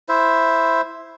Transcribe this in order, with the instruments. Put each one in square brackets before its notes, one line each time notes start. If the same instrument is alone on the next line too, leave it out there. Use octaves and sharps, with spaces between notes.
[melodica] E4 C5 E5